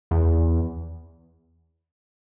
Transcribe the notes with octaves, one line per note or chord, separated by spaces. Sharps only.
E2